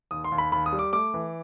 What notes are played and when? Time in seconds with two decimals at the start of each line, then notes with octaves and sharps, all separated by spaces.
0.11 D#2 D#6
0.24 C6
0.32 D#2
0.38 B5
0.52 D#2 B5
0.66 D#6
0.72 G3
0.79 D6
0.93 A3 D6
1.14 E3